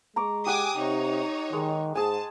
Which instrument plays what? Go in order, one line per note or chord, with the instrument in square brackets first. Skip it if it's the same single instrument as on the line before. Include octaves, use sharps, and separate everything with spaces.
[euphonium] G#3 [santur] A#5 C#6 D6
[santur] G4 F#5 [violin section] G#5 D6 D#6
[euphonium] C3 [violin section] D#4 C#5
[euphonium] D#3 [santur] G#3
[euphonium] G#2 [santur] G#4 G#5 [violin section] A5